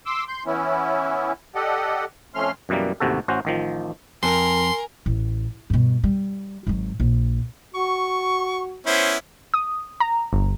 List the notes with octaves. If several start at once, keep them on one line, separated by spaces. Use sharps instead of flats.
C6 D6 E6
C6 G6
E3 B3 C#4 E4
G4 A4 D5 D#5 F#5
F2 F3 A3 C#4 C6 F6
F#2 B2 E3 G3 A#3
A1 D#2 C3 F#4 A4
A1 C#4 F#4 C5
A1 D#3 F3
F2 A#4 G#5 C6
A1
G2 B2
G3
G#1 F#3
A#1
F#4 C#6
B3 C#4 E4 C5
D#6
A#5
G1